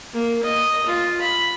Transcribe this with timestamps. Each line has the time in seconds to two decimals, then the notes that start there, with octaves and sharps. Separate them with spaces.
0.13 A#3
0.44 D#5
0.86 F4
1.21 B5